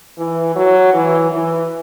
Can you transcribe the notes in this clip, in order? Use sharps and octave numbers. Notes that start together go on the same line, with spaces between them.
E3
F#3
E3
E3